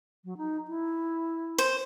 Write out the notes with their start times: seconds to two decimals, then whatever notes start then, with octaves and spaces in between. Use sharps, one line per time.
0.25 F#3
0.37 D#4
0.68 E4
1.58 C5